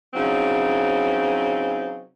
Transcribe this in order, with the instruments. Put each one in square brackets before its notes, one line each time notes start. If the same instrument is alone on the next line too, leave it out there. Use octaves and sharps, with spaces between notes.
[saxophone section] C#3 E3 F#3 C4 D#4